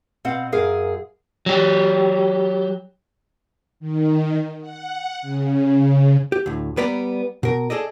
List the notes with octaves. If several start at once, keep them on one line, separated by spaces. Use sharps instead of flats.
B2 C4 F5 F#5
F#2 G#4 A#4 F5
F#3 G4
D#3
F#5
C#3
G4
D2 A2
G3 B3 B4 D5 A#5 B5
B2 A#4
G#4 A4 D5 D#5